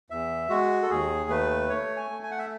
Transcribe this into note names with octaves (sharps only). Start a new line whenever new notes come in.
E2 E5
G#3 F#4
A4
D#2 G#4
A3 B4
A3 C#5
G#5
A3
G#5
F#5
E5